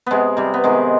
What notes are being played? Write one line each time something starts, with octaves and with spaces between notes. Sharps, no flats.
C3 G#3 B3
C3 G3
B3
D#3 G#3